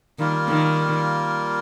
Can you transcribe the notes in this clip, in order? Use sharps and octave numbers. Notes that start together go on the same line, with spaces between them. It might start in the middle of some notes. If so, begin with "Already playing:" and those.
D#3 G3 A#3 F4 A#4
D#3